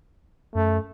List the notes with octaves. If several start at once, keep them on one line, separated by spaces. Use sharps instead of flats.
F#2 A3